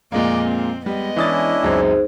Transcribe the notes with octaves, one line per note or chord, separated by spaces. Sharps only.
F2 A#2 G#3 A#3 D5 D#5
C4
G3 G#3 B3 D#5
E3 C#4 D4 E4 D#6 A6
C#2 F#2 C4 D#4 G#4 C5